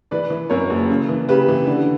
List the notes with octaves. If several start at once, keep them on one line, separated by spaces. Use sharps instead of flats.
E3 B4 D5
E3
F#2 A#4 C#5
F#1
C#3
E3
C#3 G4 B4
E3
D3